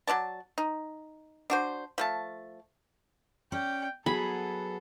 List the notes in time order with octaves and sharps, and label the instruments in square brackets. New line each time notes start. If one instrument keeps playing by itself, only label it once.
[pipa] F#3 D4 D5 A5
D#4
D4 F#4 C5
F3 A3 A5
[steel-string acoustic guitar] C#4 D5 [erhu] G5
[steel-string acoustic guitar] F#3 B3 G#4 [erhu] A4 [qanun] B5